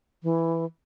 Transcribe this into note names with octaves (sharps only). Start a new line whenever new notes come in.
E3